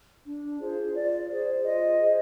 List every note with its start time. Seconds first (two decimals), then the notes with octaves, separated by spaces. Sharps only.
0.25 D4
0.59 F4 G#4 C5
0.94 F4 D5
1.28 G#4 C5 D5
1.63 F4 D#5
1.98 G#4 C5